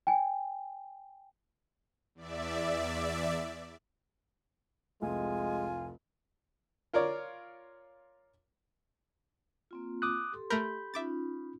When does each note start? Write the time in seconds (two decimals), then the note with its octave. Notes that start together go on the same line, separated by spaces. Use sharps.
0.07 G5 G#5
2.15 E2 D5 E5
5.02 F1 C2 G#3 F4 G#5
6.93 F4 A#4 C#5 D5
9.71 A#3 C4 F4
10.02 D6 D#6 F#6
10.32 G4 A4 C6
10.50 A3 A#4 B5 G6
10.94 C#4 D#4 F4 E5 D6 A6